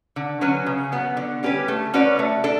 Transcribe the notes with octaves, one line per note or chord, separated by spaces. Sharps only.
D3
F#3 C#4 F#4 B4
C#3
F#3 B3
D3
G3 C#4 G4 B4
A3
C#4 F#4 B4 D5
A3
D4 A4